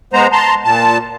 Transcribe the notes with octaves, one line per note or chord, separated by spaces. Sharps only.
G#3 B3 C5 A#5
A5 A#5 C6
A#2 A5